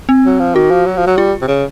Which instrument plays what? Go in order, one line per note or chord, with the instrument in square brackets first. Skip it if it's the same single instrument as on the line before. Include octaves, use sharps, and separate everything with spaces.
[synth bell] C4
[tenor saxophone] F#3
F3
[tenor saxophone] D#3 [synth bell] F#4
[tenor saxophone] F3
F#3
F3
F#3
[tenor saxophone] G3 [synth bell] F4
[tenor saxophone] C3
C#3